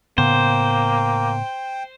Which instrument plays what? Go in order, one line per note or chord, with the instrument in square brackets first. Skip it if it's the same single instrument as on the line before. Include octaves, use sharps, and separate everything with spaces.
[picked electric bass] A2 C#3 B3 [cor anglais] A#3 [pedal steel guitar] C5 [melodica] G5